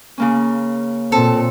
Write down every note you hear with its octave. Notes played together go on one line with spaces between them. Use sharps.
C#3 A#3 C#4
A#2 C4 A4